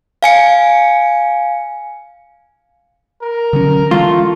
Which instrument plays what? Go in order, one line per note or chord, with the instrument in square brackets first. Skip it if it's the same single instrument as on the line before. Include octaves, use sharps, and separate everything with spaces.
[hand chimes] F5 G#5 C#7
[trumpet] A#4
[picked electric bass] D3 F#3 C#4
[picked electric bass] E3 G#3 [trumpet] A3 [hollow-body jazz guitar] F4